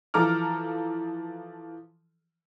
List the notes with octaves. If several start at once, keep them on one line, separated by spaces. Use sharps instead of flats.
E3 F3 A4 A#5 D6 F6